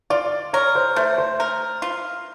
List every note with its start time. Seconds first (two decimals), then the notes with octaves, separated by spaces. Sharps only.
0.10 F4 D5
0.53 A#4 C#5
0.75 C5
0.96 A3 C5
1.18 C5
1.40 A#4
1.82 F4